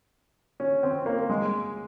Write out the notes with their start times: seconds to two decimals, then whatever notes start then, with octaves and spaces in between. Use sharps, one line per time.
0.60 C#4
0.83 C4
1.06 A#3
1.30 G#3